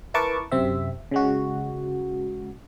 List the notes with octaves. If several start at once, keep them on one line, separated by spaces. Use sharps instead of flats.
E4 A#4 B4 A5 C#6 D6
F#2 C3 C4 E5
C#3 G#3 F#4